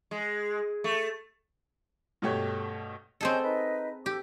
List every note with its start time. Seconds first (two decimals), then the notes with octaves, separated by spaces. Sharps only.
0.11 G#3
0.84 A3
2.22 G2 B2 A3 G4 C#5
3.21 C4 C#4 G#4 A4 D#5 G6
3.42 D#4 B4 D#5
4.06 G4 A4 D6